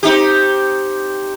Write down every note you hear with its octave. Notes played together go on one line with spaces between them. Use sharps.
C4 D#4 G4